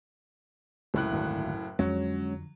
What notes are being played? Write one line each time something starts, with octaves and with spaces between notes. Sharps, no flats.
F#1 C#2 A2 C3 F#6
G#1 D2 A#2
F2 D3 F#3 G#3 C#4